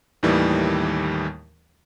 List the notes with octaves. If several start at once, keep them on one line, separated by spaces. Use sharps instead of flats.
D#2 A2 D#3 E3 G3